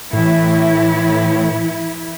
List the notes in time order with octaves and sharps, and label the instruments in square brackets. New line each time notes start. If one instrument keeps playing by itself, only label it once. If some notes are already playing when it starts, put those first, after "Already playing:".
[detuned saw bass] A2 [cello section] E3 E4